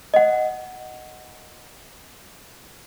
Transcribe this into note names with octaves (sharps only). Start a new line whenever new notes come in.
D#5 F#5